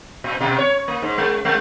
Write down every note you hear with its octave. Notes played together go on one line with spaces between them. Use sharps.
A#2
B2
C#5
A#3
G#2
G#3
G#3